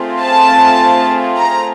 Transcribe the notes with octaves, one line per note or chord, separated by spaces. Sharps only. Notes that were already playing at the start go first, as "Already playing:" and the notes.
Already playing: A3 C4 F4 G#4
A5
A#5